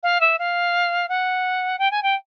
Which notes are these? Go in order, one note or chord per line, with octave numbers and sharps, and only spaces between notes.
F5
E5
F5
F#5
G5
G#5
G5